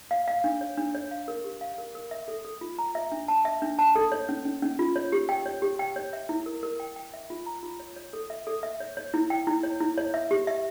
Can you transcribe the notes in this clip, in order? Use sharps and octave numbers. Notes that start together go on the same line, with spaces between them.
F5
F5
D4
C#5
D4
C#5
F5
A#4
G4
F5
A#4
A#4
E5
A4
A4
F4
A#5
E5
D4
A5
E5
D4
A5
A4
C#5
C#4
C#4
C#4
F4
C#5
G4
G5
C#5
G4
G5
C#5
E5
E4
A#4
A#4
G5
G5
E5
F4
A#5
F4
C#5
C#5
A4
E5
A4
E5
C#5
C#5
E4
G5
E4
C#5
E4
C#5
E5
G4
E5